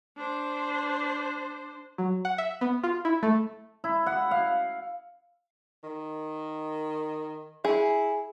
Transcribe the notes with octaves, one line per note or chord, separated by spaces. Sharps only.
D4 C5
F#3
F#5
E5
B3
F4
E4
A3
E4
F#5
F5
D#3
E4 G#4